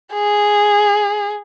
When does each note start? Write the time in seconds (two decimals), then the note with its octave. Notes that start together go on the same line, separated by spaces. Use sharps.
0.13 G#4